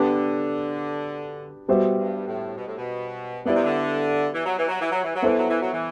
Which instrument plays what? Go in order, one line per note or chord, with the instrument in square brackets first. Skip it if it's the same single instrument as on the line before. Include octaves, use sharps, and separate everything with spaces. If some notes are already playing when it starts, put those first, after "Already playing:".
Already playing: [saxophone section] D3 [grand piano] B3 D4 G4 B4
[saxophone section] B2 [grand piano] G3 B3 F#4 C5 E5
[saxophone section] G2
A2
B2
A2
B2
[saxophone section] D3 [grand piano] B3 E4 G4 D5
[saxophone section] C3
D3
E3
F#3
E3
F#3
E3
F#3
E3
F#3
[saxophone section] E3 [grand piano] B3 E4 A4 C5
[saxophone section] F#3
E3
F#3
E3